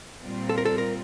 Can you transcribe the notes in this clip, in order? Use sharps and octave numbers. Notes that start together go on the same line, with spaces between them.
A#2 G3 C4 F4
A4
A#4
A4
A#4